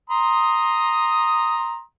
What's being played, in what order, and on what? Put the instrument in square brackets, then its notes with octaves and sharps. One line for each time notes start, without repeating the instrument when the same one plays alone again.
[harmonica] A#5 C6 D#6